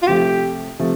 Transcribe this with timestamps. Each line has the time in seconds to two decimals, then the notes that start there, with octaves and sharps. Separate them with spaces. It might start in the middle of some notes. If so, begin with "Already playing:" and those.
0.03 F4
0.07 C3 F3 A3 G4
0.79 C3 F3 A3